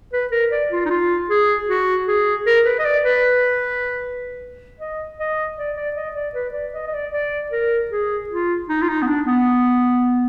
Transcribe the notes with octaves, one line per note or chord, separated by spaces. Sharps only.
B4
A#4
D5
F4
D#4
F4
G#4
F#4
G#4
A#4
B4
D#5
D5
B4
D#5
D#5
D5
D5
D#5
D5
B4
D5
D#5
D#5
D5
D5
A#4
G#4
F4
D#4
F4
D#4
B3
D4
B3